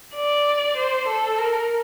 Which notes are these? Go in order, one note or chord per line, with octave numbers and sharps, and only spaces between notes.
D5
C5
A4
A#4